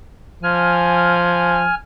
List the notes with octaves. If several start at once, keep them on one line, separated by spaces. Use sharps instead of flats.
F3 G#5 F6